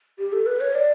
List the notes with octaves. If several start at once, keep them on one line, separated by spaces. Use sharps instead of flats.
G4
A4
B4
C#5
D5